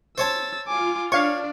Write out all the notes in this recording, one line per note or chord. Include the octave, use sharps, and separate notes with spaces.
C5 C#5 A5 E6 A6
F4 G#5 D6
D4 C#5 D5 F5 C#6